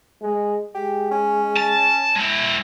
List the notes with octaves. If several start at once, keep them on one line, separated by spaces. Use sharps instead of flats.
G#3
G#3 G4
C#4
A5
G#3 E4